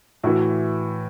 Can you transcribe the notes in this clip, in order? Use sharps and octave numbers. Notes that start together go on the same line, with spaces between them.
A2 E3 F#4